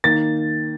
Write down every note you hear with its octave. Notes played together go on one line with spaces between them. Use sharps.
D#3 A#3 D#4 A6